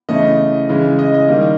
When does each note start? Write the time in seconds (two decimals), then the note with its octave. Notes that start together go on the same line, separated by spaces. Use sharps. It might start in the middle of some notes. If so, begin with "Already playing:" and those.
0.09 C#3 E3 A3 D#5
0.69 C#3 E3 G#3
0.99 D#5
1.14 D#5
1.28 D#3 G3 A#3